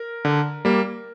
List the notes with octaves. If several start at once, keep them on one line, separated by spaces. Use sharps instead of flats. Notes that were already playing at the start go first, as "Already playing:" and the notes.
Already playing: A#4
D3
G3 A#3